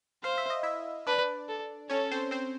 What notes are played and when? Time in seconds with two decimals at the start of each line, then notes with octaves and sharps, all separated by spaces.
0.24 C5 F5
0.38 E5
0.50 D#5
0.63 E4 E5
1.06 D4 B4 D5
1.49 A4
1.90 C#4 A4 C#5
2.11 C4 C5
2.31 C4 C5